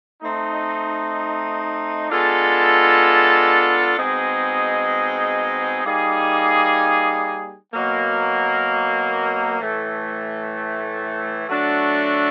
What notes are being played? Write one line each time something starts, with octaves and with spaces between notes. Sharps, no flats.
A3 C4 D#4
G#3 B3 D4 F4 A4
B2 G#3 C4 D#4 G#4
G3 A#3 D#4 G#4
B2 F#3 A#3
A2 E3 A3
F#3 A3 D4 F#4 A4